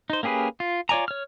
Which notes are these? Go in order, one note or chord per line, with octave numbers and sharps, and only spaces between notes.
D#4 C5
A#3 C#4 G4 G#4 B4
F4
F4 C#5 D5 G#5 A#5
C#5 F6